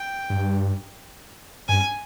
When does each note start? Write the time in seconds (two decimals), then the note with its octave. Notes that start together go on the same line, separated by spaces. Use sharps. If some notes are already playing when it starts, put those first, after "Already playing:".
Already playing: G5
0.30 G2
1.69 G2 G#5